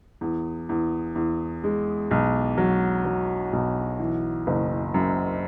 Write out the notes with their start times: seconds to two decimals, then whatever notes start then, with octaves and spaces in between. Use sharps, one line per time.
0.21 E2
0.69 E2
1.15 E2
1.64 G#3
2.11 B1
2.58 F#3
3.05 F#3
3.53 B1
3.99 E3
4.47 F#1
4.94 F#2